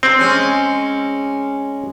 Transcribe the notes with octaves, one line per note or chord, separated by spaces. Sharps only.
C4
G#3 C#4